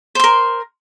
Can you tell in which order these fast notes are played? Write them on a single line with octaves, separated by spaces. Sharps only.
C5 C6 A#4